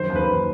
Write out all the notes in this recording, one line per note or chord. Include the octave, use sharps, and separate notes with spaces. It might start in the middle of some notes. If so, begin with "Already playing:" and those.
Already playing: F#2 D#3 C5
D#2
B4
D#2